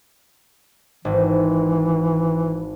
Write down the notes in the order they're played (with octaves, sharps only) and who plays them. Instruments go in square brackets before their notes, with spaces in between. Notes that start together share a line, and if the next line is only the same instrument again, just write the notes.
[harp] G#1 [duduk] E3